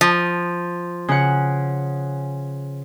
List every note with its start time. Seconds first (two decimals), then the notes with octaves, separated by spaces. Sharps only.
0.01 F3
1.08 C#3 F#5